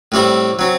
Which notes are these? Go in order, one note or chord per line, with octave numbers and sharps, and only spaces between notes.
A2 G3 C4 E4
F#3 C4